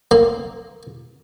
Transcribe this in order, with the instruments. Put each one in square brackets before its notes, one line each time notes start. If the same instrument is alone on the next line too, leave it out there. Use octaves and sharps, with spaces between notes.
[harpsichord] A#3